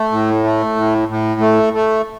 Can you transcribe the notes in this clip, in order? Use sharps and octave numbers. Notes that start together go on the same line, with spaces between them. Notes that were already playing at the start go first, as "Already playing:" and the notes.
Already playing: A3
A2
A3
A2
A2
A3
A3